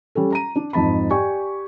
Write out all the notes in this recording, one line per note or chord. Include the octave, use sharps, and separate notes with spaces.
G3 C#4 A4
A#5 D#7
D4
F2 G#2 A5 B5
G4 D5 G#5 C#6